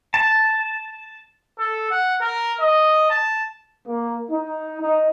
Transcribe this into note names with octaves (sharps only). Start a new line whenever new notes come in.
A5
A4
F#5
A#4
D#5
A5
A#3
D#4
D#4